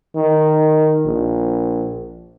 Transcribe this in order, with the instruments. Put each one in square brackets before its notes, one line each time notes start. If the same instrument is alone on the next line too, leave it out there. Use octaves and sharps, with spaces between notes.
[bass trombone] D#3
A#1